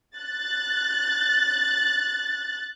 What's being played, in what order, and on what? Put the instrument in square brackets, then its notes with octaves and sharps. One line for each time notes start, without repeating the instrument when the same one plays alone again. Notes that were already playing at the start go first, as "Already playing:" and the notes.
[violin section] F#6 A6